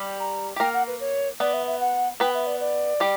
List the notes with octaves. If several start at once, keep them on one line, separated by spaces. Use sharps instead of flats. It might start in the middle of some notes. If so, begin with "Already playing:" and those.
Already playing: G3 G4
A#5
G4
A#3 A#4 G5
F#5
B4
C#5
B3 B4 D5
E5
E5
F#5
B3 B4 G5
E5
D5
D5
G3 G4